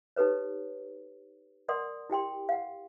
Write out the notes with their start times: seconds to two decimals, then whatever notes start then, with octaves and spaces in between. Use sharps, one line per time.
0.16 D#4 G4 A4 B4 C#5
1.68 A#4 D5 F#5 C6 D#6
2.10 E4 G4 G5 C6
2.49 F5 F#5